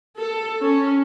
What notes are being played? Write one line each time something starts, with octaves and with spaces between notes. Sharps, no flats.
A4
C#4